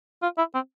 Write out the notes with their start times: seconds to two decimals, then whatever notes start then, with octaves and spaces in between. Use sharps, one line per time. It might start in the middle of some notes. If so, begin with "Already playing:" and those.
0.23 F4
0.38 E4
0.54 C4